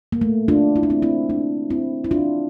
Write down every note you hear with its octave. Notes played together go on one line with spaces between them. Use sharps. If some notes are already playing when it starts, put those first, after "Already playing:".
A#3
A3
D4 F4
E4
D4
C4 E4
C4 E4
A#3 D4
C4 E4
E4
D4 F4